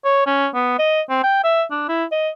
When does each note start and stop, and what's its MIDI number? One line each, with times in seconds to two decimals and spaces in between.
0.05 0.22 73
0.26 0.47 61
0.55 0.78 59
0.79 1.02 75
1.10 1.19 60
1.23 1.40 79
1.44 1.63 76
1.71 1.87 62
1.89 2.05 64
2.12 2.29 75